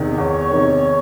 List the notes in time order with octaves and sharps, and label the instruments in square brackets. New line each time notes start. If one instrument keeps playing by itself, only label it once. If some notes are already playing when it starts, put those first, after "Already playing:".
Already playing: [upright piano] E2 C3 D#3
[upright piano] E2 [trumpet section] C#5
[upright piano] C3 D#3